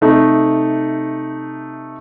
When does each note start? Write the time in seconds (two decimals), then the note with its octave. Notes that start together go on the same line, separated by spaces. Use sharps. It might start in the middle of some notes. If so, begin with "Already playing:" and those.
0.01 C3 A3 D#4